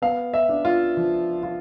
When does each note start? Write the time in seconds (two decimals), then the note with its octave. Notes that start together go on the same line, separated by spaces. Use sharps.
0.02 B3 F5
0.34 E5
0.49 D4
0.65 F4
0.97 F3
1.43 F4